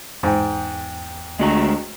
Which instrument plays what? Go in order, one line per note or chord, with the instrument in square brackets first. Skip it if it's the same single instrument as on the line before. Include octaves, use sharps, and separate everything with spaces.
[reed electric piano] E2 G5 [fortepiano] G#2
[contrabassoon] D2 [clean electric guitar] G#3 F#4 A#5